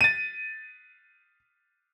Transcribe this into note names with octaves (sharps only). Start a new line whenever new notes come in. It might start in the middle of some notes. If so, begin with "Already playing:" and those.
A6 D#7